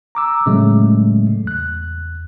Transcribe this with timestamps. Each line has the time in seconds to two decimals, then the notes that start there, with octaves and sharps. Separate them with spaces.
0.15 A#5 D6 E6
0.46 A2 C#3 F#3 G#3 A3
1.44 E2 F#6